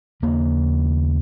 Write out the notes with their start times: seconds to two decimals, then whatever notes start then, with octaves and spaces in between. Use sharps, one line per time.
0.23 D#2 C#3 A#3